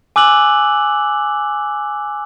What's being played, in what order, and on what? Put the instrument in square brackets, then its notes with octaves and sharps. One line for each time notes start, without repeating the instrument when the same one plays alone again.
[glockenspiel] G#5 D6 E6 F#6 F#7